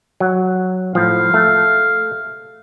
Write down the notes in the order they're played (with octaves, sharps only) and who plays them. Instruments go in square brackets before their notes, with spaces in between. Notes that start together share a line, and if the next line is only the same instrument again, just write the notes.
[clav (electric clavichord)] F#3
[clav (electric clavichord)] A2 F3 [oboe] F5
[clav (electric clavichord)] A3